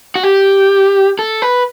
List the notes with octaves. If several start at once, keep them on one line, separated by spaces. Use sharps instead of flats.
F#4
G4
A4
B4